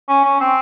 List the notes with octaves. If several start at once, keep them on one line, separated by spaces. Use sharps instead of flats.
C#4
C#4
C4